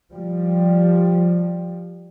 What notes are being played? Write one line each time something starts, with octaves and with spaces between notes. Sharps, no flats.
F3 G3